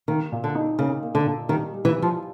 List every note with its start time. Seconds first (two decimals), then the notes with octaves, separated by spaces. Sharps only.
0.08 D#3 A#3
0.32 A#2
0.44 D3
0.55 D#4
0.78 C#3 A#3
1.02 A#3
1.15 D3
1.26 A#2
1.49 D#3 G3
1.73 G3
1.85 E3
1.97 G3
2.02 F3